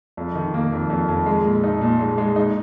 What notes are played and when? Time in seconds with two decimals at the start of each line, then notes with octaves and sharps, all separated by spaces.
0.17 F2
0.35 D#3
0.54 A#3
0.72 F2
0.90 F2
1.08 F2
1.26 G#3
1.45 A#2
1.64 D#4
1.81 A#2
1.99 G#3
2.18 G#3
2.36 D#4